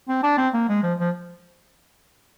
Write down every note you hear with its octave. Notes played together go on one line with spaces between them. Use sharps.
C4
D4
C4
A#3
G#3
F3
F3